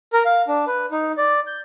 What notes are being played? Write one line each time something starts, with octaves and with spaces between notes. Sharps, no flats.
A#4
F5
D4
B4
D#4
D5
G6